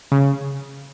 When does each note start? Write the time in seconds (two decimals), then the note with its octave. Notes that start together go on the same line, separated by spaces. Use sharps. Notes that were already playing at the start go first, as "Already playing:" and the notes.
0.12 C#3